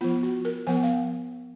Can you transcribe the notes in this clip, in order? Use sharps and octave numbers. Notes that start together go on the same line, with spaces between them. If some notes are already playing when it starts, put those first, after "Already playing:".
F3 B3 F4
F#4
A#4
F3 B3 G#5
F5